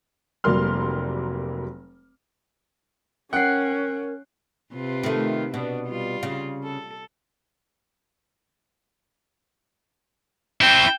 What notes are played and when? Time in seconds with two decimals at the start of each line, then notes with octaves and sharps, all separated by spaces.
0.44 F1 F#3 G3 A#3 C6 F6
3.33 C#4 A#4 F#5 G5 F#6 C7
4.74 C3 F4 B4
5.03 D#3 A3
5.54 B2 D4
5.87 G3 F4
6.23 C#3
6.64 A4
10.61 C4 E4 G5